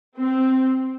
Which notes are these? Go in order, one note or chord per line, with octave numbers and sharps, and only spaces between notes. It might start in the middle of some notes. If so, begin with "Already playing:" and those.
C4